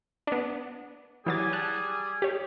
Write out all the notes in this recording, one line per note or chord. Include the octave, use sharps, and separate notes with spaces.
B3 D4
E3 F#3 G3 G#4 G#5 A6
A5 F#6
G4 C#5